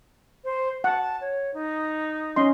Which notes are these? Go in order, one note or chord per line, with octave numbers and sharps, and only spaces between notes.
C5
F#5 A5
C#5
D#4
C#4 D#5 C6